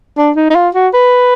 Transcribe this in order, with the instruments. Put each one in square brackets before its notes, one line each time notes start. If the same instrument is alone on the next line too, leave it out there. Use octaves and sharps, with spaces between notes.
[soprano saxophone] D4
D#4
D#4
F4
F#4
B4